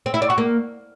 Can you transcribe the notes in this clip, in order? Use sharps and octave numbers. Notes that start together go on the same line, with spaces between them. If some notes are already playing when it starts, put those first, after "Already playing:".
C4
E4
D5
F#4
A#3